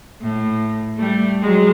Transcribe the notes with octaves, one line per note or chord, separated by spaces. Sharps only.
A2
G3 A3
F#3 G#3